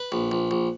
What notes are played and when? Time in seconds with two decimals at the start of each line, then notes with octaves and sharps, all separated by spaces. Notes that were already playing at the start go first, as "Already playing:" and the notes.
Already playing: B4
0.12 A#1
0.32 A#1
0.51 A#1